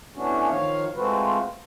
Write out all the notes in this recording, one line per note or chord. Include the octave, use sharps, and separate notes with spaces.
E3 A3 B3 C#4 D4 F#4
D#3 F3 C#5 F5
G#3 A3 C4 F4 F#4 B4